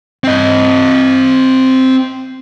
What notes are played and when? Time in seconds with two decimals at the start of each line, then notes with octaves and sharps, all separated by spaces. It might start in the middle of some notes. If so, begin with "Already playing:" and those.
0.24 C4 D#5